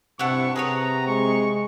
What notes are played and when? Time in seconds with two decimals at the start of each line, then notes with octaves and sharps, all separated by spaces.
0.19 G2 C3 E4 F#5 A5 C#6
0.56 C3 C4 G#4 B4 C#5 A#5
1.07 G#3 C#6